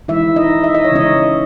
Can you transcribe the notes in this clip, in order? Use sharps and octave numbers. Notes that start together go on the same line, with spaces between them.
E3 G#3 D#4 E4 E5
D#4 D#5
E5
D#5
C#5
C#3 E3 G#3 C#4 D#4 D#5